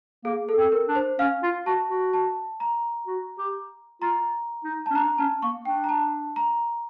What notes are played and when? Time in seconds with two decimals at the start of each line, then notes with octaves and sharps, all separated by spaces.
0.25 A#3 G#4
0.49 A4
0.57 C4
0.72 A#4
0.88 D4
0.95 C5
1.19 C#4 F5
1.43 F4
1.66 F#4 A5
1.90 F#4
2.13 A5
2.60 A#5
3.07 F#4
3.38 G4
4.02 F4 A#5
4.64 D#4
4.86 A5
4.91 C#4
4.95 D4 A#5
5.18 C#4 A5
5.42 A#3 C#6
5.65 D4 G5
5.84 A#5
5.89 A5
6.36 A#5